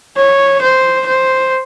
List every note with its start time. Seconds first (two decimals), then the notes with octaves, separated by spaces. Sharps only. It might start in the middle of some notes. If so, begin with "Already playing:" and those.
0.17 C#5
0.61 C5
1.06 C5